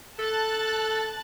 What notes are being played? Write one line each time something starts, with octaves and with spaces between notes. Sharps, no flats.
A4 A5 F#6 A6